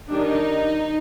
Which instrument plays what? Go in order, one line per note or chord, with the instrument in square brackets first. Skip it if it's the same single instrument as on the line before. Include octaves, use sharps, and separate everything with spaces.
[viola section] D#3 G3 D4 D#4